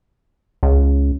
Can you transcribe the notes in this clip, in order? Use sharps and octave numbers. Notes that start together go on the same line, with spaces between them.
C#2